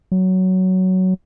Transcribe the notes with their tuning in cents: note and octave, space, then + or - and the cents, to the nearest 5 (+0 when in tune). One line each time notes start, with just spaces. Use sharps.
F#3 +10